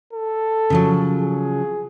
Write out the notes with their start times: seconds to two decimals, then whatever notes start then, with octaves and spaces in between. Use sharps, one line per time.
0.13 A4
0.70 C#3 F3 F#3
1.22 G#4